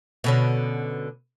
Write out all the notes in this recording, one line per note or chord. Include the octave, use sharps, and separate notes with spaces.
B2 D3 C#4